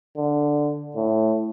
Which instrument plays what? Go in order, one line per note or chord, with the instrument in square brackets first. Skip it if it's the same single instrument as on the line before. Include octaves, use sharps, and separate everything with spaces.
[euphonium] D3
A2